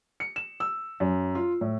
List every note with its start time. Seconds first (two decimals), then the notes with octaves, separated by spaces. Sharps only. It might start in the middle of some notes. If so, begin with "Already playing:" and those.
0.20 C#7
0.36 E7
0.60 E6
1.00 F#2
1.35 F4
1.61 A2